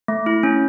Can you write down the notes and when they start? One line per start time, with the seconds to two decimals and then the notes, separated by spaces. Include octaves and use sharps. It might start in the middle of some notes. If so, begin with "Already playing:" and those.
0.08 A3
0.26 E4
0.43 C#4